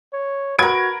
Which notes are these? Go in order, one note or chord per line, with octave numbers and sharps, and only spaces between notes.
C#5
F#4 A#4 B4 G#6 D7